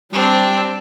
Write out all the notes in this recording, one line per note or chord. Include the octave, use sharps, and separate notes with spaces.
G3 C4 D4